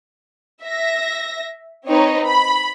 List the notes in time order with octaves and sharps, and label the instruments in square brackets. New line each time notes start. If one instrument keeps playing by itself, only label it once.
[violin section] E5 A#6
C4 D#4 B4 C#5
B5